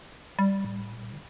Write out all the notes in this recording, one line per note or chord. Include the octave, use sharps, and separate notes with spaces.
G3
A2
A#2
D3